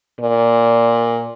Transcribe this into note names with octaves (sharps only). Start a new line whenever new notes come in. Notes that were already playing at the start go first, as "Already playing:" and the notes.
A#2